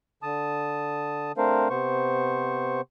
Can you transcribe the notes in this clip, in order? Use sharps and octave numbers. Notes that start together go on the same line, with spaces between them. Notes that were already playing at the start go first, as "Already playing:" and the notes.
D3 A5 D#6
A3 C4 D4 A#4 C5 F5
C3 B3 C5 C#6